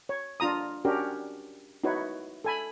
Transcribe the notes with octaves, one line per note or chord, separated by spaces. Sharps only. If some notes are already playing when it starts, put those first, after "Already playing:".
C#5
D4 F4 A#5 D#6
C#4 D4 F#4 G4 A#4
D#4 E4 F#4 B4 C#5
A4 G#5 B5